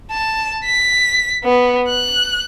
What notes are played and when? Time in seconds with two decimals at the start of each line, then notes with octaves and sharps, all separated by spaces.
0.11 A5
0.65 B6
1.44 B3
1.88 F#6